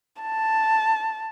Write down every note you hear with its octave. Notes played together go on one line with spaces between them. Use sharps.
A5